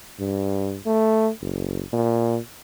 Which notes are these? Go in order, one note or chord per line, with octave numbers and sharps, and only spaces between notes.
G2
A3
F#1
A#2